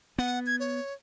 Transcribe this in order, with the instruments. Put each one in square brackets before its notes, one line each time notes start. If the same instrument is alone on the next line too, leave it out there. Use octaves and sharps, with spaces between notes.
[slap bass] B3 [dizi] F#5
[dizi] G#6
C#5